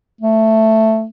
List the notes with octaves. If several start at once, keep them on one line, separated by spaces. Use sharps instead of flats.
A3